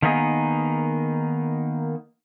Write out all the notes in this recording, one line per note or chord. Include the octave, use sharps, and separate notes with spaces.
D#3 A#3 B3 D#4 G#4